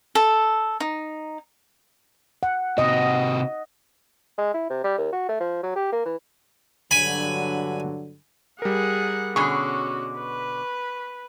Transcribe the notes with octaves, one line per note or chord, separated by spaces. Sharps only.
A4
D#4
F#5
C3 F#4 D#5
G#3
E4
C3
G3
D#2
F#4
A3
F3
F#3
G4
A#3
E3
G2 D3 F#3 G#5 B5
G3 G#4 A#4 F#5
B2 D3 C#4 F#4 G#4 C#6
B4